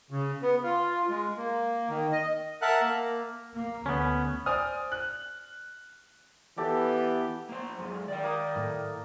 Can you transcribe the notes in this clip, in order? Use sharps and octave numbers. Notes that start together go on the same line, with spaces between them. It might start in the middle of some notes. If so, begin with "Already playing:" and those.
C#3
B3
F4
G#3
A#3
D#3
D#5
A#4 E5 F#5 A5 F#6
A#3
A#3
D2 B3 C#4
C5 D5 G#5 D#6 F6
F#6
E3 B3 G4 A4 D5
A#3 C5
F#2 G#3
D#3 D5 G5
A#3 D#6
A2